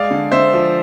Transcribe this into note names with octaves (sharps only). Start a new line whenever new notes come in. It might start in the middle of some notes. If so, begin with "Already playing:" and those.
Already playing: G#3 D5 F5
D3
D3 C5 E5
F3